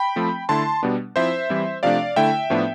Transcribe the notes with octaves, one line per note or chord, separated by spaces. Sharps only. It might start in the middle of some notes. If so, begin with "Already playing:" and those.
Already playing: G5 B5
F3 A3 C4
D3 A3 E4 A5 C6
B2 G3 B3 D4
F3 C4 E4 C5 E5
E3 G3 C4 E4
C3 F3 A3 D4 D5 F5
D3 A3 E4 E5 G5
A2 F3 B3 D4